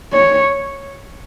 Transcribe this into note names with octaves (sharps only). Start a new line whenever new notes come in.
C#5